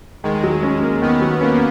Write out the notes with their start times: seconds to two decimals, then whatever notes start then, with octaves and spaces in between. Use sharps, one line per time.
0.24 D#3 G#3
0.44 F#3
0.63 C#4
0.82 A#3
1.02 D#3 B3
1.21 F#3
1.41 A#3 C#4